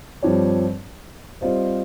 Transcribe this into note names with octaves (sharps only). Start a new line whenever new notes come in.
G2 F3 C4 G4 C#5
G3 C4 F4 C5 D#5